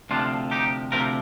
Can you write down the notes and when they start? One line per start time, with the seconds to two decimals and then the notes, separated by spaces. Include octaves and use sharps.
0.10 D2 C3 F3 D4 F4
0.51 D#4 G4
0.92 D2 C3 F3 G4 A#4